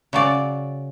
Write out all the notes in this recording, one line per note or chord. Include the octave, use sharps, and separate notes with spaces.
C#3 F#3 D5